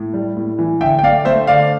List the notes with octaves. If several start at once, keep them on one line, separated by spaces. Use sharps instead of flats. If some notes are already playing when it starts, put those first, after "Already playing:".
Already playing: A2
G3
A2
E3
D3 E5 G5
G5
A3 D5 F5
A3 C5 E5
D3 D5 F5